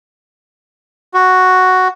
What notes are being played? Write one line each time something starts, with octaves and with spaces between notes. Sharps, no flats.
F#4